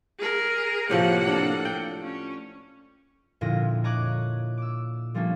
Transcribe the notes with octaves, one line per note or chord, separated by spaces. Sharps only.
G#4 A#4
A2 C3 F3 A#3 F#5
D4 A4
G5
C#4
F2 A#2 D3 E4 A#6 D#7
C#5 D#5 A#5 D6 F#6 G#6
D6 E6
F3 G3 A3 A#3 C#4 D4